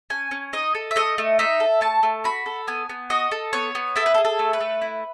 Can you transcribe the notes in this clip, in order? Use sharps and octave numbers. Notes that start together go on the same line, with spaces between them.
C#4 G#5
C#4
D#4 D#5
A4
E5
A3 D#5
A3
D#4 E5
A4
A3 A5
A3
F#4 B5
A4
B3 G#5
B3
F#4 D#5
A4
B3 C#5
B3
E4 A4
B4
A4
G#4
A4
A3
B4
A3
E4